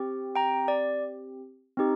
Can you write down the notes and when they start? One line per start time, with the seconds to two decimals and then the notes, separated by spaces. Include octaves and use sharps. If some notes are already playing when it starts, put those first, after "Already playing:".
Already playing: C4 G4
0.35 G5 A#5
0.68 D5
1.77 C4 D#4 G4